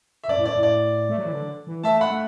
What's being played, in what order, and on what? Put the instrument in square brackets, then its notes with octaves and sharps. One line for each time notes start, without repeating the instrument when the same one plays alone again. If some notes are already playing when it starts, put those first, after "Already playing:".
[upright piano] E5
[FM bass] F#2 [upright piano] D5
[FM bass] A2
[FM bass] F#2 [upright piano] D5
[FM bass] A2
[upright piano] D5
[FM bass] A3
F#3
E3
D3
E3
[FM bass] A3 [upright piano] E5 A5
[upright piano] F#5 B5
[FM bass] A3